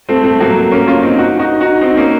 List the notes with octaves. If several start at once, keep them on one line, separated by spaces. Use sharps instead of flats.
A3 C4
A3 C4
F#3 A#3
A#3 C#4
C#4 F4
C4 D#4
D#4 F#4
D#4 F#4
D#4 F#4
C4 D#4
A#3 C#4